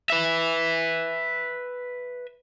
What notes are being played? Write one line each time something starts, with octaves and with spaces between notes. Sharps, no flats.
B4 E5